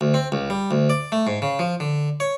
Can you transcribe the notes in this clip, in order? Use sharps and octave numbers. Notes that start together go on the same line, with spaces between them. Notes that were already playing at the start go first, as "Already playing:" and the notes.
D2
C4
C#2
G3
D2
D5
A3
G#2
C#3
F3
D3
C#5